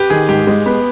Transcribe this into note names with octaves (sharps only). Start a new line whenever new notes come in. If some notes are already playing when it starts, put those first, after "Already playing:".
Already playing: G4 B4
D#3 G#4
G#2 G4
G#3
B3